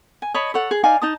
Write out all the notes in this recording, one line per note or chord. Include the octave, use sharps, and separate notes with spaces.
G#5
C#5 D#5 A5 B5
A4 C#5 F#5
G#4
D#4 D5 F5 G#5
D#4 A5 D#6